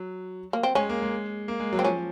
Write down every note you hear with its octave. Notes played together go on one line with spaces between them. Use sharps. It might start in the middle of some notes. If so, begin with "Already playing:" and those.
Already playing: F#3
A#3
C4
G#3 C#4
A#3
G#3
A#3
G#3
F#3
C4
F3 C#4